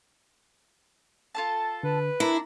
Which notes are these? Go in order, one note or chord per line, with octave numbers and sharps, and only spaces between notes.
F4 A4 A5
D3 B4
D4 E4 A#4 A#5